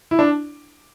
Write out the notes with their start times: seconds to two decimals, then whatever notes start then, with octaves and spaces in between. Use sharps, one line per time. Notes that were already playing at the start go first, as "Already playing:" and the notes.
0.11 E4
0.19 D4